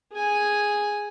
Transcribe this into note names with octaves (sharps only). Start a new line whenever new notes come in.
G#4 G#5